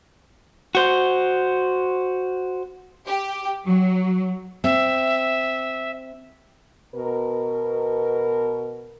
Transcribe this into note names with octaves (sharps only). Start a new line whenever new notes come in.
F#4 C5
G4
F#3
C4 E5
B2 A#4